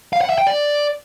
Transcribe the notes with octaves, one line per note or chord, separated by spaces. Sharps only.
F5
F#5
E5
G5
D5